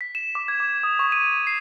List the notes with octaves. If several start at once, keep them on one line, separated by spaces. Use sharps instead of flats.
B6
E7
D6
G#6
D6
D#6
C#6
D#7
B6
C7